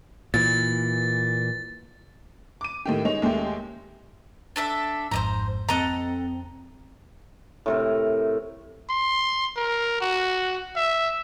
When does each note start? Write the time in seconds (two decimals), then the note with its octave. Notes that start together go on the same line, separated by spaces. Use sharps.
0.34 A#2 E3 A6
2.61 D6 D#7
2.85 A2 D#3 G4
3.05 G#3 D#4 C#5 F7
3.22 D#2 G#3 A3 G4
4.56 D4 A4 E5
5.11 G#1 F2 G#2 C5 D#5 A#5
5.69 F2 C4 A4 D#5 F#5 A#5
7.66 A2 C3 A#4
8.90 C6
9.56 A#4
10.01 F#4
10.76 E5